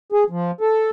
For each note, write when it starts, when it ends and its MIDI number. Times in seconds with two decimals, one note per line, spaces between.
0.12 0.24 68
0.30 0.51 53
0.61 0.90 69